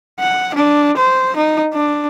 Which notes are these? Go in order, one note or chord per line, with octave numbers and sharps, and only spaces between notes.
F#5
D4
C5
D#4
D4